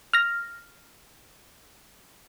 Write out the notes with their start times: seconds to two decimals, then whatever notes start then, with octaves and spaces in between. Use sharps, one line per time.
0.13 F6 A#6